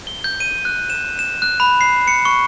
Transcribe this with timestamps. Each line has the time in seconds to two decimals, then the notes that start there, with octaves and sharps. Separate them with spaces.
0.07 G7
0.24 G6
0.40 D#7
0.65 F#6
0.90 E7
1.19 E7
1.42 F#6
1.60 B5
1.81 C7
2.08 C#7
2.25 C#6